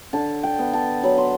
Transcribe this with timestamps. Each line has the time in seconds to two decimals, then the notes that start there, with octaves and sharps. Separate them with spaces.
0.13 D3 A5
0.43 G5
0.59 B3
0.73 A5
1.03 F#3 B5
1.18 C6